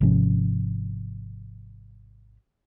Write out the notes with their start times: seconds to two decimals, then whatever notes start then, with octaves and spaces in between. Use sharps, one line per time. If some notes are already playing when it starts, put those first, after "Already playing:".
0.01 G#1 C3 F3 C#4